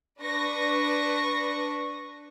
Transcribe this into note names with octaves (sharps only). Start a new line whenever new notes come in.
D4 B4 C#6 A#6